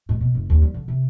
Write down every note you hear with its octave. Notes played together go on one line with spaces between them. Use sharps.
G#2
B2
F#1
D#2
G3
D3
C3